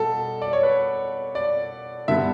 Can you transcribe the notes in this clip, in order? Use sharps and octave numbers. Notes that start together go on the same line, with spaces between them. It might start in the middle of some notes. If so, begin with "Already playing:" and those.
Already playing: B2 G3 A4
D5
C#5
B4
D5
G2 D3 G3 B3 E5